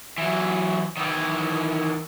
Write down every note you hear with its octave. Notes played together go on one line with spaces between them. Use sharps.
E3 F#3
D#3 E3